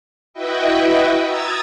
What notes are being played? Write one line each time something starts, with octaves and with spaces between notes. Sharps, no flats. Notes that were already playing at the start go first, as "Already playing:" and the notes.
E4 F#4 B4 D#5 E5 G5
A#5 D#6 E6 G#6 A6